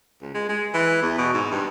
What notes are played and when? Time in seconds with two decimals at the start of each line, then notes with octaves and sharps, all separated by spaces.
0.21 C#2
0.34 G#3
0.49 G#3
0.74 E3
1.03 E2
1.18 B2
1.34 G#2
1.52 G2